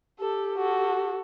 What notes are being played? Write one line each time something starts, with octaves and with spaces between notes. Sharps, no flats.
G4 A4
F#4 A4